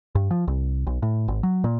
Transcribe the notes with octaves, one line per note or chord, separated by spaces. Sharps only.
G2
F3
C2
B1
A2
G#1
F#3
A#2